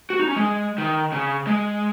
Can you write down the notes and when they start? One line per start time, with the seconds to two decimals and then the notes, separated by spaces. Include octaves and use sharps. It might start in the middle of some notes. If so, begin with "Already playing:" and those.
0.10 F#4
0.19 D#4
0.27 C#4
0.36 G#3
0.78 D#3
1.12 C#3
1.47 G#3